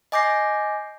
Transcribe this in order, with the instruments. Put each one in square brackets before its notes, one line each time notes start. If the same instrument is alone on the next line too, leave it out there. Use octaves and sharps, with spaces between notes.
[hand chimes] D#5 G#5 D6 G6 A#6 C7